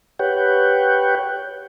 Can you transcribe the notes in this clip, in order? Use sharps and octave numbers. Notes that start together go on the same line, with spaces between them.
G4 B4 C#5 F#5 G5